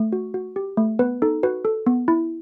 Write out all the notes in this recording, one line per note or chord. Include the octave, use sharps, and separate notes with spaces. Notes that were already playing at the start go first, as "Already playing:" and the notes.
Already playing: A3
F#4
F#4
G4
A3
B3 B4
D#4 A4
F#4 B4
A4
B3
E4